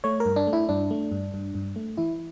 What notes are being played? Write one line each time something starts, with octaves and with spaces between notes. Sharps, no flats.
A3 C#5
A#4
G2
D4
A3
E4
G2 D4
A3
G2
G2
G2
A3
E3 E4